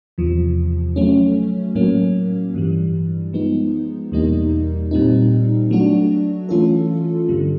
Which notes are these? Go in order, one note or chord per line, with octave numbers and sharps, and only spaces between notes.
E2 C3 F3
F#3 A3 C#4
A2 F#3 A#3 C#4
G2 E3 G3
F3 G#3 B3 D#4
E2 B2 G3 A#3 D#4
A#2 G3 C4 D#4
F#3 A3 D4 F#4
E3 A3 C#4 F4 A4
G2 D3 G3